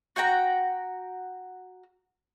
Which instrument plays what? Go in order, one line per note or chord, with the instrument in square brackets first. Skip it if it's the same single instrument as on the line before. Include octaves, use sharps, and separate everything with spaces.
[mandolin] F#4 F#5 G5 A#5